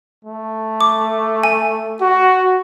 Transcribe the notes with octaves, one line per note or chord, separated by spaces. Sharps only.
A3
D6
G#5
F#4